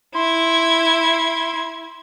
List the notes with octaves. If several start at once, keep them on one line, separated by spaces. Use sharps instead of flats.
E4 C6 G#6